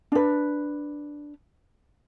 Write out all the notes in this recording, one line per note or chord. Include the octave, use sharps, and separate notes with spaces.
D4 B4